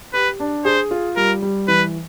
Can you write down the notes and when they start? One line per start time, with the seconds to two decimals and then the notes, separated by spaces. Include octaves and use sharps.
0.14 G4 B4
0.40 D4
0.65 G#4 C5
0.91 F4
1.17 G3 A#4
1.42 G3
1.68 E3 B4